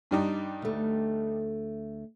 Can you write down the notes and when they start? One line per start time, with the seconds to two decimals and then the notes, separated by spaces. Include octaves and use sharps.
0.11 G2 G3 D#4
0.62 D2 A3